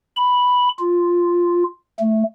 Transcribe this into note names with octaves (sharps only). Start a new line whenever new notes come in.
B5
F4
A3